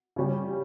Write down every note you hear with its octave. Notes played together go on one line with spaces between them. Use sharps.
C#3 G3 C#4 G4